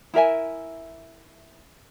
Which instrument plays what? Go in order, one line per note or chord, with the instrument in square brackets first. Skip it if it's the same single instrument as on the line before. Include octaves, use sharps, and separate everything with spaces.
[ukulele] E4 A#4 E5 G#5